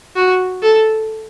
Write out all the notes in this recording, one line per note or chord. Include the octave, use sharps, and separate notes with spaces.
F#4
A4